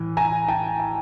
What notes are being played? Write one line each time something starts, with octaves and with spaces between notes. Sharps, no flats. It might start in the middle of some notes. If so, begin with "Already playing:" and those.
Already playing: A2 E3
G#5 A#5
G5 A5
G#5